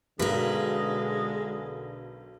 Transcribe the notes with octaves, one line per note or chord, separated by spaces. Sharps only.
B1 D3 G#3 A#4 B4